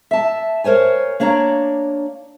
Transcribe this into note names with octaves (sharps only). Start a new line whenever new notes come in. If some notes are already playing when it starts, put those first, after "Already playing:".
E5 A5
A#4 C5 C#5 G#5
A#3 D4 C#5 D5 A#5